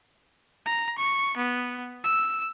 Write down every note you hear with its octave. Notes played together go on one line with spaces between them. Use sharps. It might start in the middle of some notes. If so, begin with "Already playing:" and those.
A#5
C#6
B3
E6